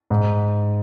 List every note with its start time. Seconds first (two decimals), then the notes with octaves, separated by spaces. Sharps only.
0.10 G#2